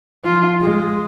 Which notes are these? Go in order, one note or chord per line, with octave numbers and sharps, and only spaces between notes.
F3 F4
G#3